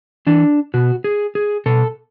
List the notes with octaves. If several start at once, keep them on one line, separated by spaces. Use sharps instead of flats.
E3 D4
B2 F#4
G#4
G#4
B2 A4